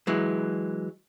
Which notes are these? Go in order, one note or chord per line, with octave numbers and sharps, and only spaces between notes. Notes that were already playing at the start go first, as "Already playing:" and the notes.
E3 F#3 G#3